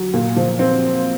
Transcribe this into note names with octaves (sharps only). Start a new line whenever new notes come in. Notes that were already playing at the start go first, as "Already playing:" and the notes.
Already playing: F#3
A#2
F3
C4